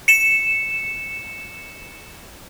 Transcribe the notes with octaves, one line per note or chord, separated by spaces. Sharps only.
C#7 E7